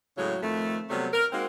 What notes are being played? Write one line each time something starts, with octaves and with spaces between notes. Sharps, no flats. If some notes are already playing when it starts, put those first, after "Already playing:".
A2 C#3 F#3 G#3 C#5
F2 D#3 A3
C3 F#3 G3 A3 B3
A#4
G#3 A#3 C4 D#4 F#4